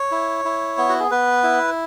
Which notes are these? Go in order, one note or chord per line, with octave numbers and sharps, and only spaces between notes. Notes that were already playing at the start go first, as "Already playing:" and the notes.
Already playing: C#5
E4
E4
B3
F#4
G#4
B3 B4
E4